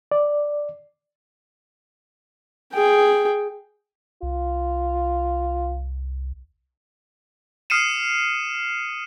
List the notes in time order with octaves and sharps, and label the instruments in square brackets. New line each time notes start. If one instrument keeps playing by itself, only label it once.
[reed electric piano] D5
[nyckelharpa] G#4 G5
[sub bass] C2 [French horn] F4
[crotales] D#6 F6 C7 C#7 D#7 E7